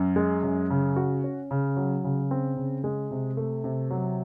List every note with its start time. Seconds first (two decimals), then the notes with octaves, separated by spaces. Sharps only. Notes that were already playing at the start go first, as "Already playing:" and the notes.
Already playing: F#2
0.16 G#3
0.43 F#2
0.70 C#3
0.96 F#4
1.24 C#4
1.51 C#3
1.77 F#3
2.04 C#3
2.31 C4
2.57 C#3
2.84 G#3
3.11 C3
3.37 A3
3.64 C3
3.90 F#3